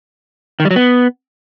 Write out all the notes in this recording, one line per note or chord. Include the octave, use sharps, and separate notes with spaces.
D#3
G3
F#3
B3